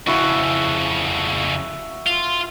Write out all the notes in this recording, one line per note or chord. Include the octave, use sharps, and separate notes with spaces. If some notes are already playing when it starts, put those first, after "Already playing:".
F2 C#3 E4 F#4
F4